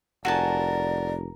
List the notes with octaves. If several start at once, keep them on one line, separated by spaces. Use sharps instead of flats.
F1 F#4 A#4 D5 G#5 A5